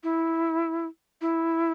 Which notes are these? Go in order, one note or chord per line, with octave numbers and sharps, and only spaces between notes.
E4
E4